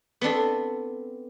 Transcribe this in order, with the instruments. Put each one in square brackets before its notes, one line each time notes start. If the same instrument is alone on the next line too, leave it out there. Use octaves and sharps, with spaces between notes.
[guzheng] B3 C4 D4 A4